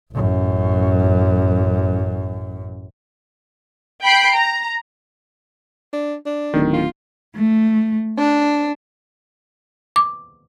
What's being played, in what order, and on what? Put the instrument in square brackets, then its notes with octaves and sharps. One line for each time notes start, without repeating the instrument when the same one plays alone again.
[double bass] A1 F#2
[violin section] G5 B5 C7 D7
A#5
[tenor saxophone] D4
D4
[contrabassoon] D1 [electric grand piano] D#3
[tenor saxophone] F4
[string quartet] A3
D4
[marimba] D6